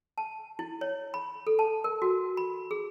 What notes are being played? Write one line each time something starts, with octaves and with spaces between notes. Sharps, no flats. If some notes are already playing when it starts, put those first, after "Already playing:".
A5
E4
C#5
B5
A4
A5
A#4
F#4
B5
G#4